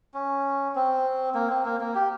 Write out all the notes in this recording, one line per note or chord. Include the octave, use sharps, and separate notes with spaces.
C#4
C4
A#3
C4
A#3
A#3
G4